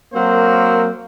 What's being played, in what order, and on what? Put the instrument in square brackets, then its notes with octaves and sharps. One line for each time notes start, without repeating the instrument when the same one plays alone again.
[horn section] F#3 A#3 C4 F#4 A#4 C5